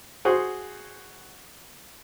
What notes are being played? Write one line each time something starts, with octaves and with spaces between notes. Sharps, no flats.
F#4 G#4 C5